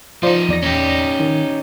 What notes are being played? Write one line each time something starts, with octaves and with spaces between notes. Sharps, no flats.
F3 D#4 F4 C5 D5
E2 D5 A#6
C#4 D#4 G4
D#3